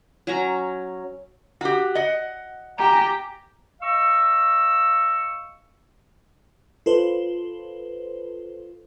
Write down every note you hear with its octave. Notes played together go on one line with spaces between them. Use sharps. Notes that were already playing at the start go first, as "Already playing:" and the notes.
F#3 C#4 A#5
F#4 G4
D#5 F#5
G4 G#5 A#5
D#5 F5 C#6 E6
F4 A4 B4 C5